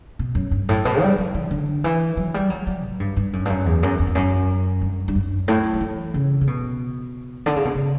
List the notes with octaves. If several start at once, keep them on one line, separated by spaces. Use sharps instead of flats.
B2
F#2
G2
A2
B2
G3
F#3
E3
D3
E3
F#3
G3
F#3
F#3
A2
G2
G2
F#2
G2
F#2
E2
F#2
F#2
E2
F#2
G2
G2
F#2
A2
F#3
E3
C#3
C#3
B2
D3
C#3
B2
C#3